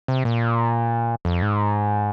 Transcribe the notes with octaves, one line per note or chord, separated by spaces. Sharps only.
C3
A#2
F2
G#2